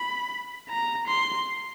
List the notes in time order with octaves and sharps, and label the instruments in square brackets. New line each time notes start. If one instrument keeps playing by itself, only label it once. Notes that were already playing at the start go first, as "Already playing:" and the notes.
Already playing: [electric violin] B5
A#5
C6